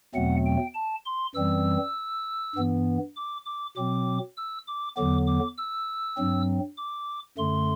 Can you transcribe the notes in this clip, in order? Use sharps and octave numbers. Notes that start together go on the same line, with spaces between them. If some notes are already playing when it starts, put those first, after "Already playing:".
E2 B2 F#3 A3 C4 F#5
G5
A5
C6
F#2 E3 G3 C4 E6
G2 E3 B3
D6
D6
B2 F#3 C4 D6
E6
D6
E2 D3 F#3 B3 D6
D6
E6
G2 F#3 C4
D6
F#2 D3 A3 C6